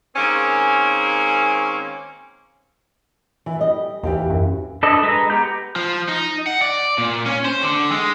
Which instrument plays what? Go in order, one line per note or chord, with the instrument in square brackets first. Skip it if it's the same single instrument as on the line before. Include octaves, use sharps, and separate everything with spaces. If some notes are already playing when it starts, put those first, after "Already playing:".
[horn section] D#3 G#3 A#3 C4 C#4
[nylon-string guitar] E3
G3 D#5
[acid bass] D#2 [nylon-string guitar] E3 G4 F5
[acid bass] F#2
[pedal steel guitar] D4 A4 B4 D#5
G#3 B4 A#5
B3 G4 A#5 G6
[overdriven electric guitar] F3
D#4
F#5
D5
A#2
C#4
C5
D3
G#3